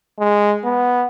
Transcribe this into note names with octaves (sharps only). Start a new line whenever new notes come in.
G#3
B3